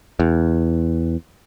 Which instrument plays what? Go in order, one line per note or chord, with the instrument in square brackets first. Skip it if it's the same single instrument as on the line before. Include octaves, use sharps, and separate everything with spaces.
[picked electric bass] E2